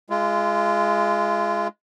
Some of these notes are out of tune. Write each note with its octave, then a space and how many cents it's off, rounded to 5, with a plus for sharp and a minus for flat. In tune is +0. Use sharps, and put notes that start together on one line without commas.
G#3 +0 F4 -30